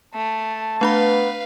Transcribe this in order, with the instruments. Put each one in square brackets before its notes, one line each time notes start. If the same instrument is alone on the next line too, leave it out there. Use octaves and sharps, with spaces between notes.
[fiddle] A3 [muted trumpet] A5
[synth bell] A3 D4 B5 [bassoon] B3 [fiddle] B4 F5